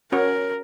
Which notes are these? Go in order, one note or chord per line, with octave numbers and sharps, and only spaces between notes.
C#4 F#4 A#4 C#5